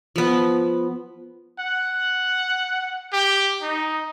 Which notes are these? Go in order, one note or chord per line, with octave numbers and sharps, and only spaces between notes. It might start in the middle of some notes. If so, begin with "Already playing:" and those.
F3 B3
F#5
G4
D#4